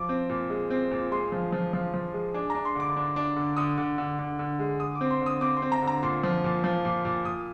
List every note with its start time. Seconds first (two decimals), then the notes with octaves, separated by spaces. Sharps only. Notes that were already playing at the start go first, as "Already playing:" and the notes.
Already playing: F3 D6
0.09 C4
0.29 A#2
0.50 G#3
0.70 C4
0.91 A#2
1.12 G#3 C6
1.32 F3
1.52 F3
1.73 F3
1.94 F3
2.14 G#3
2.34 D4 G#5
2.50 D4 A#5
2.65 C6
2.75 D3 D6
2.96 D4
3.16 D4
3.36 D3
3.57 D3 D#6
3.78 D3
3.98 D3
4.19 D3
4.39 D3
4.59 G#3
4.80 D3 D#6
4.95 D6
5.01 C4
5.11 C6
5.21 D3 D#6
5.41 C4 D6
5.57 C6
5.62 C4
5.72 A#5
5.82 D3
5.88 A#5
6.03 A#2 C6
6.24 F3
6.44 A#2
6.64 F3
6.85 A#2
7.05 A#2
7.25 A#2 D#6